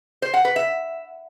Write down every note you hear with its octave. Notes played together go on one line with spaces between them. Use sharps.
C5
F#5
B4
E5